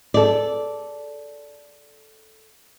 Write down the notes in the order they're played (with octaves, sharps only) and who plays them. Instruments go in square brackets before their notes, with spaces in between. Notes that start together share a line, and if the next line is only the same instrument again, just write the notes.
[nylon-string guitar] A4 D5